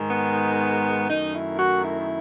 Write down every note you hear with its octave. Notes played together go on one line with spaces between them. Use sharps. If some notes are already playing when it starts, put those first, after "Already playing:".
Already playing: G#2 D#3 G#3
B3
F#2 D#3 A3 D#4
E4
F#4
E4